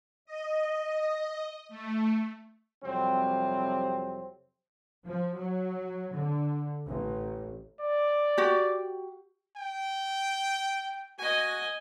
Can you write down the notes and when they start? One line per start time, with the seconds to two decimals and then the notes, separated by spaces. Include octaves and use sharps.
0.25 D#5
1.69 A3
2.84 F2 C3 F#3 G3 C4
5.06 F3
5.37 F#3
6.13 D3
6.88 A1
7.81 D5
8.38 F#4 G4
9.56 G5
11.19 F#4 D#5 G#5